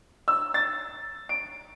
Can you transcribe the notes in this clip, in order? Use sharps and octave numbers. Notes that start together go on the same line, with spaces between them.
E6
A6
D7